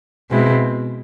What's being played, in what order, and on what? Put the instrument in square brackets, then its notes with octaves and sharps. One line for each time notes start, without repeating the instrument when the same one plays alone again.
[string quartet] B2 G#3 C4 E4